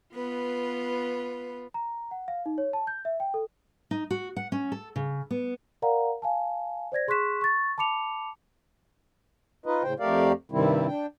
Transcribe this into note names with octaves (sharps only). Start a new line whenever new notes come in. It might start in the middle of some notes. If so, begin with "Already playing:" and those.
B3 F4 B4
A#5
F#5
F5
D#4
C#5
A5
G6
E5
G5
A4
D#4
F#4
F#5
C#4
A4
C#3
B3
A#4 D5 F5 F#5 A#5
F5 G#5 A5
C5 D5 G#6 A#6
G#4 C6 C#6 F#6 B6 E7
C#6 A6
A5 B5 D6 C#7 F7
D#4 F4 B4 D#5
A2 C#3 C5 G5
F2 A3 G4 A#4 D5 F5
G2 C3 D#3 G3 C4 E4
D4 G5